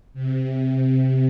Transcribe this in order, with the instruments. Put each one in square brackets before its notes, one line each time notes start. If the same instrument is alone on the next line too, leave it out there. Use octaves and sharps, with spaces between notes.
[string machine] C3